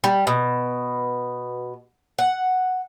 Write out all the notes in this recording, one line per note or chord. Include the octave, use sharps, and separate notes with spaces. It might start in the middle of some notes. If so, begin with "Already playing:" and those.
G3
B2
F#5